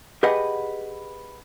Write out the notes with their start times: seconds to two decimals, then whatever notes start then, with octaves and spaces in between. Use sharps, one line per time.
0.23 G4 G#4 B4 D#5 F#5